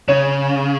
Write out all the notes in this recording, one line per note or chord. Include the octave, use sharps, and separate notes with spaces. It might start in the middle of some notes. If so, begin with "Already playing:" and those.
C#3 C#5